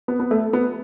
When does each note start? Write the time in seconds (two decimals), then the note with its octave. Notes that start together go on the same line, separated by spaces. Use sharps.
0.08 B3
0.20 B3
0.31 A3
0.53 B3